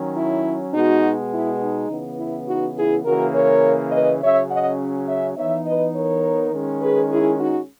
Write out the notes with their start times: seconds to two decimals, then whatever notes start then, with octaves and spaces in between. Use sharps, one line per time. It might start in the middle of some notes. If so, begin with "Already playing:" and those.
Already playing: D#3 F#3 C#4
0.17 E4
0.74 B2 G#3 B3 D#4 F#4
1.33 E4
1.61 D#4
1.90 C#3 E3 B3
2.19 E4
2.47 D#4 F#4
2.77 E4 G#4
3.05 C#3 E3 A#3 F#4 A#4
3.34 A#4 C#5
3.92 B4 D#5
4.22 C#3 F#3 C#4 C#5 E5
4.51 D#5 F#5
5.08 C#5 E5
5.37 E3 B3 D#4 C#5 E5
5.65 B4 D#5
5.94 A#4 C#5
6.53 D#3 G#3 C#4
6.82 G#4 B4
7.11 E4 G#4
7.39 D#4 F#4